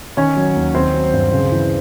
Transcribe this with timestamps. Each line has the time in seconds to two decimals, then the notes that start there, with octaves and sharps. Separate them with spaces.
0.17 D#3 C#4 C#5
0.36 F#3
0.56 D#2
0.75 D#3 C4 C5
0.93 F#3
1.14 G2
1.33 C#3
1.52 E3